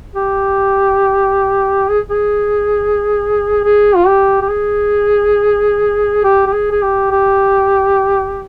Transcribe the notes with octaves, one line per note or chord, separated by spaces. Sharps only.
G4
G#4
G#4
G#4
F4
G4
G4
G#4
G4
G4
G#4
G#4
G4
G4